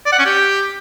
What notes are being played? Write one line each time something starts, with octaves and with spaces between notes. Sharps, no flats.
D5
F#5
C#4
G4